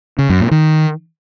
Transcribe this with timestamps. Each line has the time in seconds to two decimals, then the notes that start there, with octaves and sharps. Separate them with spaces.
0.19 C#3
0.29 F#2
0.40 A#2
0.51 D#3